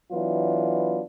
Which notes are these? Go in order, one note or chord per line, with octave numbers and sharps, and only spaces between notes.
E3 F#3 B3 D4 F4